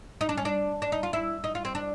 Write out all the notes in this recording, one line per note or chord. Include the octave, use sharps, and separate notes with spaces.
D#4
D4
C#4
D4
D4
D#4
F4
E4
D#4
F4
C4
D4